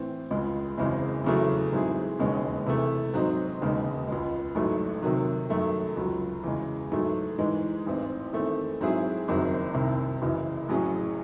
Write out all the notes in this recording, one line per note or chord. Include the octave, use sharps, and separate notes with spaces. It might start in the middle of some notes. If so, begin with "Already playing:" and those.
Already playing: A2 E3 C4
C#2 C#3 G#3
F#1 E2 C#3 G#3 C4
E2 C#3 F#3 A3
G#2 F#3 C4 E4 G#4
E1 D#2 C#3 G#3 C#4
C3 E3 A3
G#2 F#3 C4 D#4
E1 D#2 C#3 G#3 D#4
C#2 C#3 G#3
A1 G#2 F#3 A3
C3 D#3 F#3
F#2 D#3 F#3 A3
C#2 C#3 F#3
E2 C#3 G#3
G#2 F#3 A3
G#2 E3 G#3
A1 G#2 E3 C4
E2 D#3 A3 C4
G#2 F#3 C4 E4 G#4
F#1 F#2 D#3 F#3 C4
C2 C3 D#3
F#1 F#2 C#3 E3
A1 A2 F#3 C#4 G#4